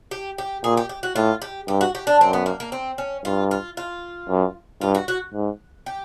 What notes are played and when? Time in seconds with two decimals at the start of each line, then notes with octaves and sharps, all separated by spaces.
0.11 G4
0.38 G4
0.64 A#2 G#4
0.77 G4
0.89 G4
1.03 F#4
1.16 A2 F4
1.42 G4
1.68 G2 G4
1.81 F#4
1.95 G4
2.07 D4
2.20 F#2 C4
2.33 B3
2.46 A#3
2.60 A#3
2.72 C4
2.98 C#4
3.25 G2 F4
3.51 F4
3.77 F4
4.29 F#2
4.81 G2 F4
4.95 F#4
5.08 F#4
5.34 G#2
5.86 G4